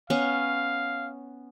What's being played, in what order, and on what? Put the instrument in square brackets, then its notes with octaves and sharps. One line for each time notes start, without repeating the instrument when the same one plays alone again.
[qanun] B3 C#4 C#6 [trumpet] F5